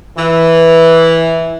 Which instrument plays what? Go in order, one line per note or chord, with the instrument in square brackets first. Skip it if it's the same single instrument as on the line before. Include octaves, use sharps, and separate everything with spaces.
[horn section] E3